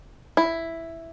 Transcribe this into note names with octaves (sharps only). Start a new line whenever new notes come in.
E4